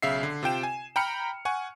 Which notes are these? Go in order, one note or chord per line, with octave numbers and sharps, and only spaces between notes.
B1 C#3 E5 F5 C7
D3
C3 F4 G5 E7
G#5
G5 A#5 B5 F6 C#7
F#5 G#5 C#6